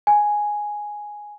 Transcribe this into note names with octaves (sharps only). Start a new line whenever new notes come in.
G#5